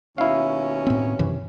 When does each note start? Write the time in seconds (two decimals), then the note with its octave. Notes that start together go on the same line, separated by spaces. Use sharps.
0.18 D#2 B2 C#4 E4 F5
0.87 A2 C4
1.19 F#2 C3 E3